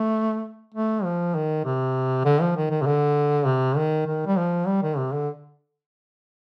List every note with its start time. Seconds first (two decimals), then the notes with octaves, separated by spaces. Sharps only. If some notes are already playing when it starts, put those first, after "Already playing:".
Already playing: A3
0.74 A3
1.04 F3
1.35 D#3
1.65 C3
2.25 D3
2.41 F3
2.56 D#3
2.71 D#3
2.82 C3
2.87 D3
3.46 C3
3.77 D#3
4.07 D#3
4.26 G3
4.37 F3
4.67 G3
4.82 D#3
4.98 C3
5.13 D3